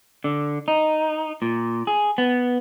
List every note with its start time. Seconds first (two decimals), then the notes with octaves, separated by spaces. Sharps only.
0.24 D3
0.68 D#4
1.42 A#2
1.87 G#4
2.18 B3